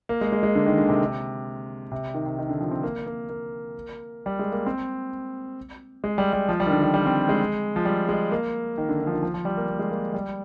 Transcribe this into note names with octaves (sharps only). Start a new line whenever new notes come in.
A#3
G#3
G#3
G#3
D3
D#3
D3
C3
C3
D#3
C3
D#3
D3
F3
C4
A#3
A#3
A#3
G3
G#3
A#3
C4
G#3
G3
G3
F3
G3
D#3
D3
D#3
G3
C4
G#3
F3
G3
G#3
A#3
D#3
D3
D3
F3
D#3
F3
F3
G3
A#3
A#3
G#3
A#3
G3